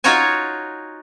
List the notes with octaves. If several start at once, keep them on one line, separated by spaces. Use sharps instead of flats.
D#4 F4 F#4 C#5 D#5 G#5